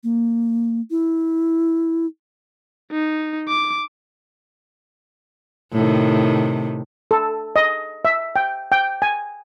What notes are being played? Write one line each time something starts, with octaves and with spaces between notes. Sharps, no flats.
A#3
E4
D#4
D6
A2 C3 D#3
A4
D#5
E5
G5
G5
G#5